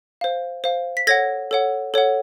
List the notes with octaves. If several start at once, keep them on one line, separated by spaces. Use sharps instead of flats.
C5 F5
C5 F5
B6
A4 C#5 F#5 G#6 A#6
A4 C#5 F#5
A4 C#5 F#5